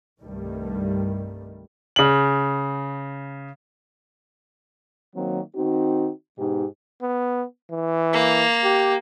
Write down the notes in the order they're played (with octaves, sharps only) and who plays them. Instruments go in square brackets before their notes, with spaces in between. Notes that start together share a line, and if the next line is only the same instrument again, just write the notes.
[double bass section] C2 G2 D#3 G3 A3
[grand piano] C#3 F#7
[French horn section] D#3 F#3 A#3 C4
D#3 C4 D#4 F#4
G#2 B2 D#4 G4
[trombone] B3
E3
[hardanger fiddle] A#3
[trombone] G4